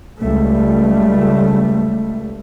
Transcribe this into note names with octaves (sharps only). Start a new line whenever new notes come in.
C#2 G3 A3